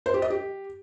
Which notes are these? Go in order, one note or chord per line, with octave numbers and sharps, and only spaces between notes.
C5
G4
D#5
G4